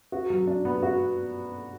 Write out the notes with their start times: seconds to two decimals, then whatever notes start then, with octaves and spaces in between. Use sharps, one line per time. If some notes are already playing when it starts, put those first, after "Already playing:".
0.12 F#4
0.30 F#3
0.47 D4
0.65 B3
0.83 F#4